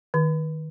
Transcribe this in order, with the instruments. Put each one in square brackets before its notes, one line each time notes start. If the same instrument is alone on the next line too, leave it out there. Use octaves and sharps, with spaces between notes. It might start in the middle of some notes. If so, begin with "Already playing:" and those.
[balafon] D#3